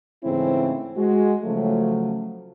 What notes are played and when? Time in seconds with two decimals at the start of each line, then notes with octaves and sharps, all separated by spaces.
0.24 G#2 C#3 E3 A3 C4 E4
0.97 G#3 F#4
1.44 C#3 F3 F#3 A3